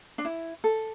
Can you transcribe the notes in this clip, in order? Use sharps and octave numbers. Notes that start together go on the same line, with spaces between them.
D4
E4
A4